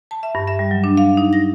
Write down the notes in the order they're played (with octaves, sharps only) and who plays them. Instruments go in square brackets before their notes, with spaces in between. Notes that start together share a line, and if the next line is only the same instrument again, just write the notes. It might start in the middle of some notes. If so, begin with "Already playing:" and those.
[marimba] A5
E5
G2
E5
G3
F#3
D4
F5
D#4
A#6